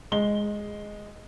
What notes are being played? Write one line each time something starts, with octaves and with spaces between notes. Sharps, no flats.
G#3 G7